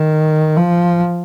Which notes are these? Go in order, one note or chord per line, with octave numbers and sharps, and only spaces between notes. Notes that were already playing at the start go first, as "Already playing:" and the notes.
Already playing: D#3
F3